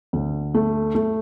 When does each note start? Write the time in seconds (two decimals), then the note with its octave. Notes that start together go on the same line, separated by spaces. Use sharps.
0.13 D2
0.54 A3
0.95 A3